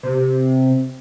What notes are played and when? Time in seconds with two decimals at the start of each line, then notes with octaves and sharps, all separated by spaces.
0.03 C3